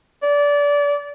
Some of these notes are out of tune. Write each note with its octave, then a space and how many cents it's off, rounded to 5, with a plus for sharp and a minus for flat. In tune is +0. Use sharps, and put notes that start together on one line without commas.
D5 -25